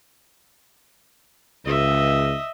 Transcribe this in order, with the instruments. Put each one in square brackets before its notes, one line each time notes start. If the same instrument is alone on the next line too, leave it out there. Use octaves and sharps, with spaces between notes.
[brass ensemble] C#2 [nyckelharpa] D#5 E5